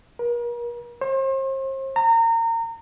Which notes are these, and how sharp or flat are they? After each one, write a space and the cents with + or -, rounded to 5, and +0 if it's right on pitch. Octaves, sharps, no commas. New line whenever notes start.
A#4 +40
C5 +40
A#5 -30